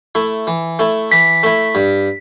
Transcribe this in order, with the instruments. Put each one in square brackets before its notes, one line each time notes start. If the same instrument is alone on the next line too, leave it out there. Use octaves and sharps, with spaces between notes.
[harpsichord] A3 E4
E3
A3 E4
[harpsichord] E3 [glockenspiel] B6
[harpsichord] A3 E4
G2